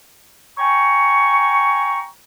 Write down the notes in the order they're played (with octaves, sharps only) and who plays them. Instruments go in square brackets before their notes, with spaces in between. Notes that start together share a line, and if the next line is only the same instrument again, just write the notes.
[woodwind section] G5 G#5 A#5 C#6